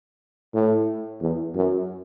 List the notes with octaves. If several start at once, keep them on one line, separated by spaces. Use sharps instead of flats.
A2
E2
F#2